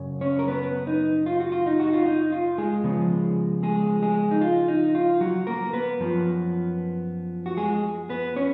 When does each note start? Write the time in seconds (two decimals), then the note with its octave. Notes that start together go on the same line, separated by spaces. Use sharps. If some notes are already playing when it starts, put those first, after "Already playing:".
Already playing: F#2 C#3 F#3
0.21 C#4 C#5
0.39 A#4
0.48 B3 B4
0.87 D#4
1.26 F4
1.40 F#4
1.52 F4
1.66 D#4
1.80 F#4
1.93 F4
2.06 D#4
2.32 F4
2.58 G#3 G#4
2.84 C#3 F3 B3
3.63 G#3 G#4
4.02 G#3 G#4
4.31 D#4
4.41 F4
4.68 D#4
4.95 F4
5.21 F#3 F#4
5.47 A#3 A#4
5.73 B3 B4
6.00 F#2 F3 B3
7.46 F#4
7.57 G#3 G#4
8.09 B3 B4
8.36 C#4 C#5